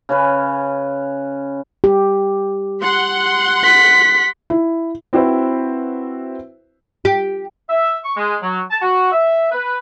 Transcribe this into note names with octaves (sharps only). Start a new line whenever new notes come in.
C#3 C#4 B4
G4
F#5 C6
B6
E4
C4 E4 F#4 B4 C5 E5
G4
E5
C#6
G#3
F#3
A5
F#4
E5
B4